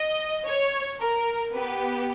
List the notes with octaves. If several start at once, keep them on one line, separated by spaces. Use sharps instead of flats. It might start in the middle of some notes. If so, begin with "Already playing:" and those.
Already playing: D#5
C#5
A#4
B3 G4 B4